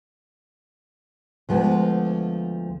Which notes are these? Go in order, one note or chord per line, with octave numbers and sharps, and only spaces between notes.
D2 F3 G#3 B3